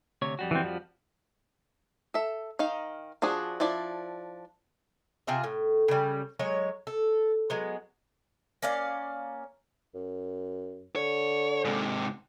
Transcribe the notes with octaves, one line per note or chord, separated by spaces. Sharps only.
D2 C3 C#5
F2 G3 F#4
E3 C4
F3
A4 E5
D#3 D#4 F5
F3 D4 F#4 G#4
F3 D4 E4 D5
C3 F4 G#4 E5
A2
C#3 G3
F#3 G#3 C#5
A4
F#3 G#3 B3
A#3 C#4 D5 F5
F#2
D3 C#5
G#2 C3